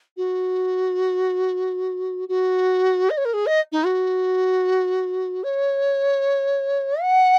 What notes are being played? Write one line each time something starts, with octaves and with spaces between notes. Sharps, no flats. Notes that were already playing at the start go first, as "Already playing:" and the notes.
F#4
F#4
D#5
C#5
A#4
G#4
D#5
D#4
F#4
C#5
F#5